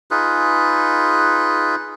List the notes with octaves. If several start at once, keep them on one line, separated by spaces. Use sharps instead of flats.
D#4 F4 G#4 B4